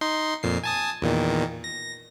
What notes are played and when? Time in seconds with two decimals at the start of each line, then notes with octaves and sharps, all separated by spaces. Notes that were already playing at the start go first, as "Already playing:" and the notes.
0.01 D#4 C6
0.43 F2 A#2 C7
0.64 G#5 A5 D#6
1.02 E2 A#2 D#3
1.64 A#6